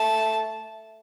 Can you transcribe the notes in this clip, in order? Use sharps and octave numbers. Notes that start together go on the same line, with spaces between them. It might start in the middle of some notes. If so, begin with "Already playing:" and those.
Already playing: A3 A5